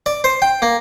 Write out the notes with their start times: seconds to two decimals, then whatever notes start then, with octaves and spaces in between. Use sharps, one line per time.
0.06 D5
0.24 C5
0.42 G5
0.62 A#3